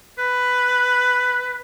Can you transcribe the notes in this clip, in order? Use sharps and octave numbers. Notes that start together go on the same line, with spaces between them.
B4